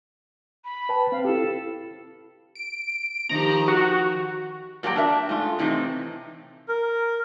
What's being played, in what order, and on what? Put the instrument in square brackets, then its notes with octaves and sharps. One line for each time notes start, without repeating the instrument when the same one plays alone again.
[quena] B5
[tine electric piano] B4 G5 A5
[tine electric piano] C4 [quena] F5
[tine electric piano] E4 G4 [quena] A4
[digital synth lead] D7
[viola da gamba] D#3 F3 G4 [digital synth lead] A#5
[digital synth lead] F#4
[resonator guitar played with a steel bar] A#2 F#3 G3 A4 G5 A#5
D4 A#4 E5
G#2 A3 F4
A2 C3 E3 C4 D#4
[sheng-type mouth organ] A#4